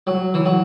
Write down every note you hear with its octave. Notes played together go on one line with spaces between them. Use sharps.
F#3
E3
F#3